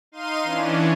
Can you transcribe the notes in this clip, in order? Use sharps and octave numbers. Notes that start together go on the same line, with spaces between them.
D#4 F5 C6 D#7
E3 C#4 D4